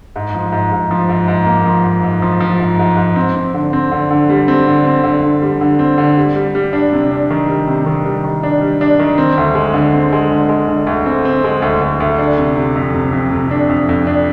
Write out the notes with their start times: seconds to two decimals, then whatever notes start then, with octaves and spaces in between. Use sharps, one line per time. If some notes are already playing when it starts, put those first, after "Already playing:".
0.16 G#2
0.35 F3
0.52 G#2
0.72 G#2
0.91 F3
1.09 G#2
1.28 G#2
1.47 A#3
1.66 F3
1.84 G#2
2.03 G#2
2.22 F3
2.40 F3
2.60 G#2
2.79 G#2
2.97 G#2
3.16 C4
3.35 C4
3.54 D3
3.73 C4
3.92 D3
4.11 D3
4.30 G3
4.48 C4
4.67 D3
4.85 C4
5.04 D3
5.23 D3
5.42 G3
5.61 D3
5.79 C4
5.98 D3
6.17 G3
6.36 G3
6.55 G3
6.73 D4
6.93 C3
7.11 D4
7.30 D#3
7.48 G3
7.68 C3
7.86 D#3
8.06 G3
8.24 D#3
8.43 D4
8.61 G3
8.81 D4
8.99 D#3
9.18 C4
9.37 D2
9.55 G#3
9.74 D3
9.93 C4
10.13 G#3
10.30 D3
10.49 G#3
10.68 D3
10.87 D2
11.06 C4
11.25 C4
11.44 G#3
11.62 D2
11.81 D2
12.00 D2
12.18 D4
12.38 C3
12.56 C3
12.76 F2
12.94 C3
13.13 F2
13.31 C3
13.51 D4
13.69 F2
13.89 F2
14.07 D4